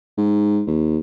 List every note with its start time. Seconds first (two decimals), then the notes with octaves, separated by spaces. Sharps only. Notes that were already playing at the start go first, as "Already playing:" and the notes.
0.18 G#2
0.67 D#2